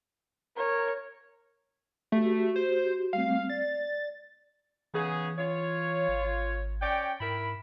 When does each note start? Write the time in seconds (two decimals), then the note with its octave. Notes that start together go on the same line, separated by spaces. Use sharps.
0.57 A#4 C#5
2.12 A3 F#4 G4
2.56 C5
3.13 G3 A3 C4 F5
3.49 D5 A6
4.94 C#3 E3 B3 G#4
5.38 F4 C#5
6.09 G#1
6.81 C#4 D5 G5
7.20 G#2 E4 A#4 B5